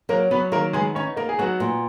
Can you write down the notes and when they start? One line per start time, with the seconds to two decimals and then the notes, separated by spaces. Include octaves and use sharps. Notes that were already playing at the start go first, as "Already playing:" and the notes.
0.09 F#3 A#3 A#4
0.31 F#3 B3 B4
0.52 D#3 A#3 A#4
0.73 G#3 B3 G#4
0.95 C#4 D#4 C#5
1.17 A#3 D#4 A#4
1.29 G#4
1.39 F#3 B3 F#4
1.60 A#2